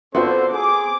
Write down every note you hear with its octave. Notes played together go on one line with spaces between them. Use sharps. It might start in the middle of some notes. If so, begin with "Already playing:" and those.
D3 B3 C4 F4 F#4 B4 C5
G#4 D6